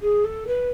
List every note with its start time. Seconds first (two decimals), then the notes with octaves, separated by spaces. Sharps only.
0.01 G#4
0.24 A4
0.47 B4